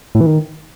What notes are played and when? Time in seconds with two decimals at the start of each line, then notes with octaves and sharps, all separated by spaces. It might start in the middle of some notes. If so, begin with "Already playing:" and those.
0.15 A2
0.21 E3
0.26 D#3